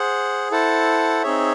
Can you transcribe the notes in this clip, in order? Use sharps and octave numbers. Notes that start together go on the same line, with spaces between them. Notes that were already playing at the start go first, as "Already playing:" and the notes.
Already playing: G#4 C5 F#5
E4 A4 C5 F#5 A5
C4 D#4 G#4 C#5 E5